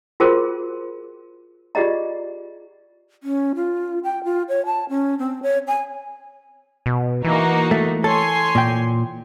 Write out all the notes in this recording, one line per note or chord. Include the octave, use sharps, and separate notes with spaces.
F4 F#4 G#4 A#4 C5
F4 G4 G#4 D5 D#5 A#5
C#4
F4
G5
F4
C#5
A5
C#4
C4
C#5
G#5
B2
E3 A#3 D#4 F#4
A3
A4 C#5 G#5 C6
A#2 G5